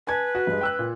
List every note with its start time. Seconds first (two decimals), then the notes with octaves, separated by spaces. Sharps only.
0.07 B4 G#5 A5 G#6
0.35 F#4
0.47 G2 G#3
0.61 G5 E6 F#6
0.79 A#2